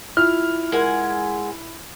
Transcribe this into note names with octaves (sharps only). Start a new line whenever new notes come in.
E4 F4 F6
G#3 A#4 F#5 G#5